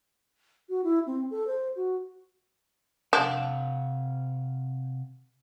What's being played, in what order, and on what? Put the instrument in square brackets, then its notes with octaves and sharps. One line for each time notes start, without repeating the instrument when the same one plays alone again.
[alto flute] F#4
E4
C4
A4
C5
F#4
[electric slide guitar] C3 F5 F#5 [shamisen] D4